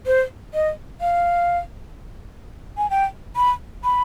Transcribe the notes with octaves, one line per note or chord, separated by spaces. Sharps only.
C5
D#5
F5
G#5
G5
B5
B5